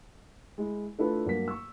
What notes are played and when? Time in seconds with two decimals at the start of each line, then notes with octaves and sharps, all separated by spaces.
0.58 G#3 E4
0.99 A3 D4 E4 F4 A4 B4
1.26 G2 F#3 A#3 B6
1.48 C#6 E6